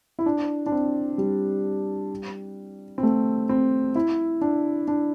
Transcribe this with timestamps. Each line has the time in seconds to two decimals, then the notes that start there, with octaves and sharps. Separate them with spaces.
0.19 E4
0.26 D4
0.66 D4
0.72 C4
1.18 G3
2.98 C4
3.03 A3
3.49 C4
3.95 E4
4.41 D4
4.88 D4